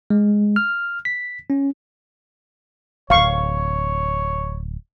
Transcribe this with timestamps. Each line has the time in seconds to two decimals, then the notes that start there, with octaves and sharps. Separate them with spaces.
0.10 G#3
0.56 F6
1.05 B6
1.50 C#4
3.10 D1 G#1 C#5 F5 C#6